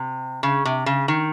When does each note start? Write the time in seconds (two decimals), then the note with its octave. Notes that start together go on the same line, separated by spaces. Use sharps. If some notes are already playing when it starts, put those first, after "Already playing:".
Already playing: C3
0.43 C#3
0.65 C3
0.86 C#3
1.08 D#3